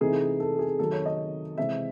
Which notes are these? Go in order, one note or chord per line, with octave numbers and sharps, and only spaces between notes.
C3 E3 A3 D#4 G#4
A4
G#4
D#3 F#3 A3 A4
C#5
D#5
C3 E3 G#3 C4 E5